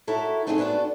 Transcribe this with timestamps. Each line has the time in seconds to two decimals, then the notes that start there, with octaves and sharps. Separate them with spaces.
0.07 E4 F#4 A4 A#4 C#5 E5
0.47 A3 C4 C#4 D#4 F#4 G#4
0.58 B3 D4 F#4 A4 D5